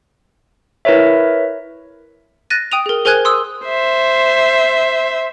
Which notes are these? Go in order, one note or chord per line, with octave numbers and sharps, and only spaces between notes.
E4 A#4 B4 C#5 E5
F#6 A6 A#6 D#7
G5 D#6 D#7 F7
G#4 A#4
G#4 A#4 C5 G#5 F#6 G#6
C6 D#6 E6
C5 E5